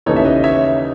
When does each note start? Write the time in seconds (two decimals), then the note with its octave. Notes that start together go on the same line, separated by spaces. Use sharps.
0.06 D#2 C#3 E3 B3 D#4 A4 C#5
0.16 E5
0.25 B4 D#5
0.36 D#5
0.44 C#5 E5